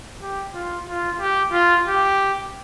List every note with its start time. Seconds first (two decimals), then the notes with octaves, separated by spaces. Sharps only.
0.22 G4
0.55 F4
0.88 F4
1.21 G4
1.52 F4
1.86 G4